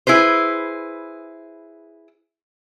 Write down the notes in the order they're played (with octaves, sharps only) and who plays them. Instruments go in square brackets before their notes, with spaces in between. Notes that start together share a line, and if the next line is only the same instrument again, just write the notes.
[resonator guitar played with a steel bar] E4 G#4 B4 C5